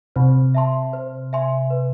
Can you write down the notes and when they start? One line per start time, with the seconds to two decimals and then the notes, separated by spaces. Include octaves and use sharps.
0.16 C3 C5
0.54 E5 A5 C6
0.93 C5
1.33 E5 G#5 C6
1.70 B4